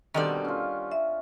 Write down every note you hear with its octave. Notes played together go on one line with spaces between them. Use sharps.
B2 D3 D#3 G3 C4 D5
C#4 F4
E5